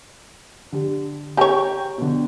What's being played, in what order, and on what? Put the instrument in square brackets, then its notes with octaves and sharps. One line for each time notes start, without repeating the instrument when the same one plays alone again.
[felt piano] D3 G4
[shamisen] G4 C#5 [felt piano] G5 A#5
[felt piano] B2 D3